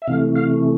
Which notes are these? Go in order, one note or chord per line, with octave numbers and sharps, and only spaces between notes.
E5
C3 E3 A3 F5
F5